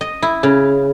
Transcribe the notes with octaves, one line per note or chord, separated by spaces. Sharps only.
D#5
E4
C#3